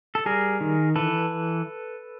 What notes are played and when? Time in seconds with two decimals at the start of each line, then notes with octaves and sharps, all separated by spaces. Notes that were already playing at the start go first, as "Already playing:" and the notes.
0.15 A4
0.26 G3 G#4 A#4
0.60 D#3
0.96 E3 A4 B4